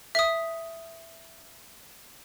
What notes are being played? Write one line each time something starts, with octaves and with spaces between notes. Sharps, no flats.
E5 D#6